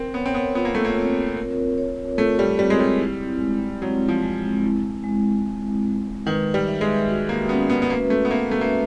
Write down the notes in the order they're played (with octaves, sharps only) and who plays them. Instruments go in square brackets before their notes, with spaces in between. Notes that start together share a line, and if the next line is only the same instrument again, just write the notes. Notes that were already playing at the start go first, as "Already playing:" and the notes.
Already playing: [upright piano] C4 [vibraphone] A#4
[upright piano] B3 [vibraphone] C#5
[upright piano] C4
B3
[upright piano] B3 [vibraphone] F4
[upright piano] A#3
A3
A#3
[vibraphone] C4
A#4
C#5
[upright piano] A3 [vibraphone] F4
[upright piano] G3
[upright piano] G3 [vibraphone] C4
[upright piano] G#3
G3
[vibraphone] E4
G#3
[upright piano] F#3 [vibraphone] C4
[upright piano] F3
[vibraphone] G#3
E4
G#3
C4
G#3
[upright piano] D#3 [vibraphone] B4
[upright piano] G3
[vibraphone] E5
[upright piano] G#3
[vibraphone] F#4
[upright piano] A#3
[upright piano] B3 [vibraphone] C#4
[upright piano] B3
B3
[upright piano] A#3 [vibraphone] B4
[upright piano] A3
B3
[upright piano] A#3 [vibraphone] E5
[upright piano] A3
A#3